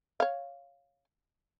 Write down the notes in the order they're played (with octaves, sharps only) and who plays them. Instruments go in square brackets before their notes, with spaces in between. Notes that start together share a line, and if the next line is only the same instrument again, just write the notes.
[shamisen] C#5 F5